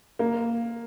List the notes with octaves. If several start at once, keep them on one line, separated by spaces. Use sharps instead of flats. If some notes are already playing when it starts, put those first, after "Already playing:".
A#3